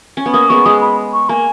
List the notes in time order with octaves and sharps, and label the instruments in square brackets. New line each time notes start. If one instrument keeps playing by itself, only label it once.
[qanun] C#4
B3
[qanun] A#3 [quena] D#6
[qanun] G#3 B3 [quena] C#6
[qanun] G#3 [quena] D#6
[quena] B5
C#6
[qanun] A#3 [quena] G#5